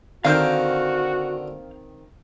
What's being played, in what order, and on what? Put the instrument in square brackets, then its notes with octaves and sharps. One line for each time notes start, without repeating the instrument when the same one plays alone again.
[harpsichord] D3 A#4 [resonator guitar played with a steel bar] D#3 C4 [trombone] F#4 [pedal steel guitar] F5 F6 G6